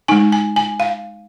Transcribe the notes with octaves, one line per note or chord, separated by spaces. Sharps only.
G#3 D#4 G#5
G#5
G#5
F5